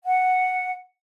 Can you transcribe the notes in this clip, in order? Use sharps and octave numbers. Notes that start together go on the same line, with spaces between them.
F#5